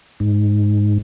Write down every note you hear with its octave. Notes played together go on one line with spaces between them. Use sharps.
G#2